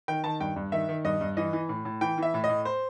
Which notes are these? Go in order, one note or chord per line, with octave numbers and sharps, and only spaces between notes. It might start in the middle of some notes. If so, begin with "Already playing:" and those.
D#3 G5
D#3 A5
G2 G5
G2
D#3 E5
D#3
G2 D#5
G2
E3 D#5
E3
A2
A2
E3 G5
E3 E5
A2
D#5
A2
C5